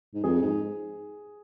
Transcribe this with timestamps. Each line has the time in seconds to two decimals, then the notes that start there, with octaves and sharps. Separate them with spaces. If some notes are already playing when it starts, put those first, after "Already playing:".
0.14 G#2
0.24 F2 G#4
0.42 G#2